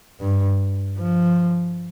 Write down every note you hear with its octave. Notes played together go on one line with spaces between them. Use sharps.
G2
F3